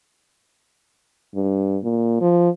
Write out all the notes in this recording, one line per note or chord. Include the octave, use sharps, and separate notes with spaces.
G2
A#2
F3